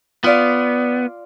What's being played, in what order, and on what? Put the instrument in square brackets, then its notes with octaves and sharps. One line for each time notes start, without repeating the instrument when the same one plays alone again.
[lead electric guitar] B3 [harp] F4 D5 F5